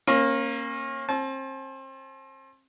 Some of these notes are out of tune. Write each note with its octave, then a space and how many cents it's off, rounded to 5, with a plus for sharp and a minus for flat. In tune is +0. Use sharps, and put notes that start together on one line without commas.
A#3 +0 C#4 -35
C4 +35 A5 -35